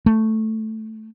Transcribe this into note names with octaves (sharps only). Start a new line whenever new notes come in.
A3